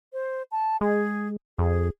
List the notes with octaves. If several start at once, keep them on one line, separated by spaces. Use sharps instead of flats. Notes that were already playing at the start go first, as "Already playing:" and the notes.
C5
A5
G#3 G#4
F2 G#4